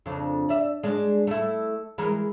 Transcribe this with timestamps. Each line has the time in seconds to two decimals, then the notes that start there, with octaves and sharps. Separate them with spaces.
0.06 F2 C#3 D4
0.49 D5 E5
0.83 G#3 D4
1.27 A3 E4
1.98 E3 G#3 A#4